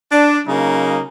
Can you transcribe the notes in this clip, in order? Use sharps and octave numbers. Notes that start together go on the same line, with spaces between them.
D4
C#3 F#3 A#3 D#4